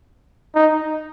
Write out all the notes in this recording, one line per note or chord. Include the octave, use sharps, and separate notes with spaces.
D#4